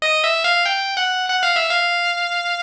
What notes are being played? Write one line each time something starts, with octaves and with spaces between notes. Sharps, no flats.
D#5
E5
F5
G5
F#5
F#5
F5
E5
F5